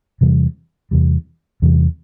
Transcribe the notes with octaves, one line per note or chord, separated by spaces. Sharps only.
E2 C3 E3 G3
E2 C3 E3 G3
E2 C3 E3 G3